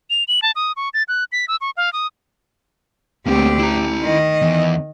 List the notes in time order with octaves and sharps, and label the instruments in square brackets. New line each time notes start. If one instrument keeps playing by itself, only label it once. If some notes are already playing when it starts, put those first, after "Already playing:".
[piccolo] F7
F#7
A5
D#6
C#6
A6
F#6
B6
E6
C#6
F5
D#6
[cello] D2 G4 [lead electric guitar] A#3 C4
[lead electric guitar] E4 A#5
[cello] D#3 D#5
[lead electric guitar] E2